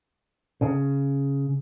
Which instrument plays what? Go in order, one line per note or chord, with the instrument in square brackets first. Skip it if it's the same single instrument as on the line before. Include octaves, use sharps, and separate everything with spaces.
[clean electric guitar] C#3